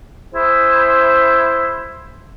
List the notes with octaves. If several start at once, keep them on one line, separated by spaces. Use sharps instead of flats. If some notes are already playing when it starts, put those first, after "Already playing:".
E4 G#4 C5